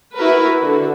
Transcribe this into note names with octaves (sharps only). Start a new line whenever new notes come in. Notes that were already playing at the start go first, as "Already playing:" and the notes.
E4 F#4 A#4 B4
D3 F#4